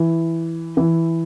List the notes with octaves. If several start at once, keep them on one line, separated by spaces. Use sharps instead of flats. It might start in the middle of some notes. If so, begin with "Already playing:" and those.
Already playing: E3
E3